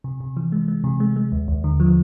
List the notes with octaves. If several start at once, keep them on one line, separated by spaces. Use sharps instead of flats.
C3
C3
E3
G#3
G#3
C3
G#3
G#3
D#2
D#2
D3
F3